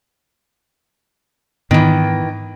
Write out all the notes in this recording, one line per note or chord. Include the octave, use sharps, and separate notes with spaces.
G#2 D#3 E3 B3